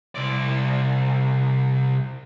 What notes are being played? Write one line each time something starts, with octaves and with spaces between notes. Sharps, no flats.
C2 D5